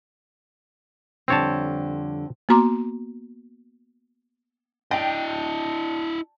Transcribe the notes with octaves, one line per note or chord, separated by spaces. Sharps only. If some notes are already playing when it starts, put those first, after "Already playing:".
F2 D3 G3 C4 C#5 A5
A#3 B3 F#4 A#5 C6 D6
D4 E4 D#5 G5